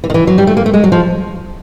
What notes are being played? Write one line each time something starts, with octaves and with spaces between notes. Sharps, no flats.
E3
D#3
E3
F#3
G3
A3
A#3
A3
G#3
F#3
F3